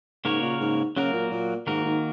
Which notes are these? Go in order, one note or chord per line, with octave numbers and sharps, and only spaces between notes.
G#2 C#3 A#3 F#4 A#4 C#5
A#2
G#2
C#3 F#3 A#3 F#4 A#4
A#2
A#2
G#2 D#3 A#3 F#4 A#4
G#2